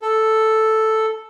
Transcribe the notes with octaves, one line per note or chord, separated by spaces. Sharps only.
A4